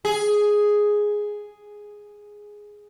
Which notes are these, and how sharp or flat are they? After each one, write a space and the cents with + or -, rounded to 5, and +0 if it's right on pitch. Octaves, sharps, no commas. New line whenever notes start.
G#4 +0